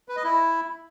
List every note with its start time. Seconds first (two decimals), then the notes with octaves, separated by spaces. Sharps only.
0.09 B4
0.16 D#5
0.24 E4